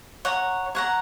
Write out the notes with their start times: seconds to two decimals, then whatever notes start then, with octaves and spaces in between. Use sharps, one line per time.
0.25 C#5 F#5 A#5
0.75 C#5 F#5 A#5